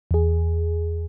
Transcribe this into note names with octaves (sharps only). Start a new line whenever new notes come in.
E2 G#4